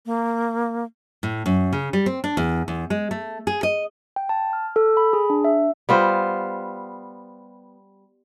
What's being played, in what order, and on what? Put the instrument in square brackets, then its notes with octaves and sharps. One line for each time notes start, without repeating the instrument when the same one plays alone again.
[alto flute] A#3
[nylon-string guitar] A2
F#2
C#3
G3
C4
D4
E2
E2
G#3
A3
G#4
D#5
[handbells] G5
A5
F6
A4
B5
G#4
D4
E5
[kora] G3 B3 F4 C5